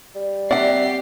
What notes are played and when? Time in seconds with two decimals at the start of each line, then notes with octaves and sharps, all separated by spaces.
0.15 G3
0.51 C4 G4 D5 E5 F#5 C7